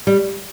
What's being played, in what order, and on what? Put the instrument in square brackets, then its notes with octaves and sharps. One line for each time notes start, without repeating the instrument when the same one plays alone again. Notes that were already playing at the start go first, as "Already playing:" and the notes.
[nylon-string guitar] G3